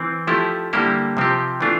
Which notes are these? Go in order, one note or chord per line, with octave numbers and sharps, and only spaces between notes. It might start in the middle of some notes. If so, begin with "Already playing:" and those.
Already playing: E3 C4
F3 A3 E4 G4
D3 G3 A#3 E4 G4
C3 F3 C4 G4
E3 A3 D4 F4